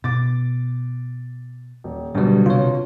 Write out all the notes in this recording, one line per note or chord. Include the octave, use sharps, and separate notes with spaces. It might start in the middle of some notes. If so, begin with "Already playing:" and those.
B2 D6 A6
D#1
D2 B2 F#3 G3
C3 F4 C#5